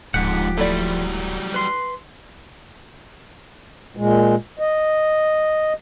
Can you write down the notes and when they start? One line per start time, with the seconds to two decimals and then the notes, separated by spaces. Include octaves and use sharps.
0.14 D1 F2 G#2 F3 G4 F#5
0.57 F#3 G3 A3 E4 D5
1.54 B4 C6
3.97 A#2 G#3
4.59 D#5